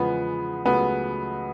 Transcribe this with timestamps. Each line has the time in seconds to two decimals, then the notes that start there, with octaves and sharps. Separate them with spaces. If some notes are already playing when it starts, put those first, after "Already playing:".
Already playing: E2 C#3 F3 G#3 B3
0.65 C#2 C#3 F#3 A3 B3